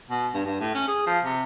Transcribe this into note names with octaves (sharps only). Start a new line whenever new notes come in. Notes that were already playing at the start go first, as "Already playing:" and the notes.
B2
G2
G2
A2
C#4
G#4
F3
C3